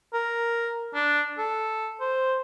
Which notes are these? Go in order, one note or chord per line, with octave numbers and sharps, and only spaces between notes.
A#4
D4
A4
C5